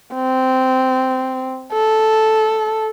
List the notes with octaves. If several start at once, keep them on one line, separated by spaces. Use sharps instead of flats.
C4
A4